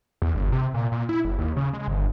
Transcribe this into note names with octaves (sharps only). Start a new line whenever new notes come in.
E2
G1
C3
A#2
A#2
E4
F#1
D#2
C#3
G#3
G1